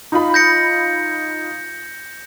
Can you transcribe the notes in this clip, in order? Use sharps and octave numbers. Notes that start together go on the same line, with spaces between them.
D#4 F4 B5
G6 A#6 C#7